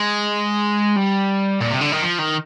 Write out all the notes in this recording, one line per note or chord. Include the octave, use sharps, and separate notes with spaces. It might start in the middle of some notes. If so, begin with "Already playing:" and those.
Already playing: G#3
G3
A#2
C3
D3
D#3
F3
D#3